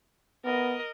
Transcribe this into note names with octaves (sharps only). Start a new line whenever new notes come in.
B3 A#4 D#5